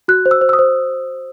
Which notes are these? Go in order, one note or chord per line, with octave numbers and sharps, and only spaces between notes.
F#4 F#6
C5
E6
C5
E6
D#6
C5